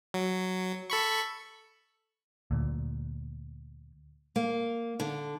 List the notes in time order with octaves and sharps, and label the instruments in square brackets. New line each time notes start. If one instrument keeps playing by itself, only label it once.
[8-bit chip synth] F#3
A4 B5 C#6
[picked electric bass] D2 A#2
[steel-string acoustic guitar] A#3
D3